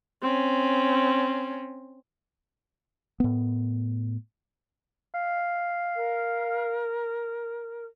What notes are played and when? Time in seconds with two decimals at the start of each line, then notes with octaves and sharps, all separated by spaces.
0.22 C4 C#4
3.20 A2 B3
5.14 F5
5.96 A#4